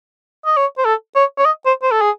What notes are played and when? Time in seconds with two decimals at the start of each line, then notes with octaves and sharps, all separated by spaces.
0.46 D#5
0.57 C#5
0.78 C5
0.85 A4
1.15 C#5
1.38 C#5
1.45 D#5
1.66 C5
1.82 C5
1.91 A4
2.01 G#4